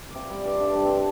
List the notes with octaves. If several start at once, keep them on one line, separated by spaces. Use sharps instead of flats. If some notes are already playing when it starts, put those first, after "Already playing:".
C3 D5 F5
G3 D5
G2 D5
G2 C5
A4
G2 G4
C4 D4